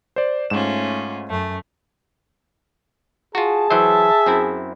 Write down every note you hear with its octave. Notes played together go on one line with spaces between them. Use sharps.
C5 D5
G#2 A3 C#4 F4 E7
F#2 A3
F4 F#4 G#4 A5
E3 F#3 C5 E5
F#2 C4 E4